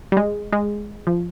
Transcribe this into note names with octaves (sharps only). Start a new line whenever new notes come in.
G3
G#3
G#3
F3